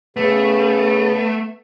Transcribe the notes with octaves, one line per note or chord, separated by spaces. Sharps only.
C#3 A3 B3